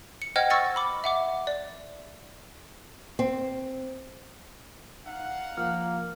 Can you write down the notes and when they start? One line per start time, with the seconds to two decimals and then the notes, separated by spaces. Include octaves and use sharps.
0.22 C#7
0.36 C5 D#5 F#5 G5 F6 G#6
0.50 C#6 E6 F6 A6 A#6 C#7
0.76 B5 D6
1.04 E5 F#5 D6
1.47 D5
3.19 C4
5.06 D#4 F5 F#5
5.58 F3 A#3 F6